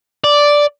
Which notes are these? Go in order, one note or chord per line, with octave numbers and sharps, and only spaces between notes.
D5